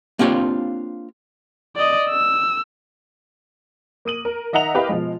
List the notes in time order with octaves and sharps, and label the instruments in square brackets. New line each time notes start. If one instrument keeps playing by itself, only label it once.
[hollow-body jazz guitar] A#3 C4 D4 F4 G4 C#5
[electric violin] D5 D#5
E6
[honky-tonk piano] A#3 D#6 D#7 F#7
A#4
D#3 D#5 E5 F#5 A#5 F7
E4 G4 A#4 B4 D#5 F5
B2 F3 G#3